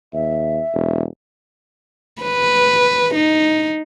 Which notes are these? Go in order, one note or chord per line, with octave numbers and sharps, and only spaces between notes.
D#2 E5
E1
B4
D#4